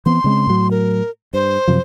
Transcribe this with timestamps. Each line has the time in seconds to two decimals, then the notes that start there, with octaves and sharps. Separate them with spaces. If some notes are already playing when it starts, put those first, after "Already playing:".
0.06 E3 B3 C4 C6
0.24 C#3 G#3 C4
0.47 A2 F#3
0.71 A#4
1.33 G2 C5
1.68 F#2 C3 F3